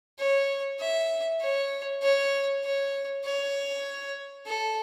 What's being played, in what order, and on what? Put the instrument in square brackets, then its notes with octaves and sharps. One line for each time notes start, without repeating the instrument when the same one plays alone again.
[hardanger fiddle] C#5
E5
C#5
C#5
C#5
C#5
A4